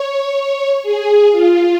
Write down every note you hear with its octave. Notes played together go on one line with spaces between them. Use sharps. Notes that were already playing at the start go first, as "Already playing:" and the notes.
Already playing: C#5
G#4
F4